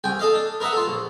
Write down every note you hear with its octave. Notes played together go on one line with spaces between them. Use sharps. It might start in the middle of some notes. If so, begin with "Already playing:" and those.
C2 G5 G#5
A4 D#5 F5
D4
A#4 B4 D#5 E5 F#5
F4 A4
A#1